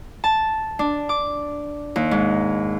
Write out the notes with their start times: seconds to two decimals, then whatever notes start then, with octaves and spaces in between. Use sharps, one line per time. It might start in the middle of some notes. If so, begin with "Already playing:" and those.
0.24 A5
0.79 D4
1.09 D6
1.96 D#2
2.11 G#2